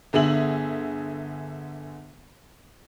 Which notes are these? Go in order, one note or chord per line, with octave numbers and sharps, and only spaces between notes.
G1 D3 G#4 E5 F#7